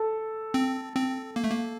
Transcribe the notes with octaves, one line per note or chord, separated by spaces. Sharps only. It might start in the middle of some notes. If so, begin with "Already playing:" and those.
Already playing: A4
C4
C4
A#3
A3
A#3